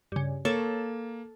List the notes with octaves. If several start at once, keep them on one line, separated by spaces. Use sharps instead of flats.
G2 C#3
A#3 A4 C#5